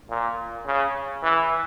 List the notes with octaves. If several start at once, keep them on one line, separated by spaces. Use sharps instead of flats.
A#2
C#3
E3